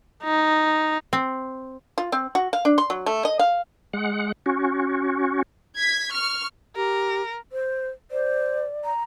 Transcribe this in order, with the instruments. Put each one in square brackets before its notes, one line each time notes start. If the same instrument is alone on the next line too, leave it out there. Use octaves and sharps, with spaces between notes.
[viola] D#4
[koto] C4
[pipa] F4
C4
F#4
F5
D4
C6
F#3
A3
D#5
F5
[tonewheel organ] G#3 F#5
C#4 F#4
[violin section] G#6 B6
C#6 F6
[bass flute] G4 [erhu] A#4
[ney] C5
[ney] C5 [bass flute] D5
[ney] A#5